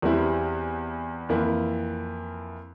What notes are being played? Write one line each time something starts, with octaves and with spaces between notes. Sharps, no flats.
E2 E3 G3 C4 E4
F2 E3 A#3 E4